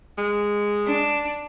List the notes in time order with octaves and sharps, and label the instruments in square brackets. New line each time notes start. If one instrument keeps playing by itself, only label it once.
[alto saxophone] G#3
[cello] D4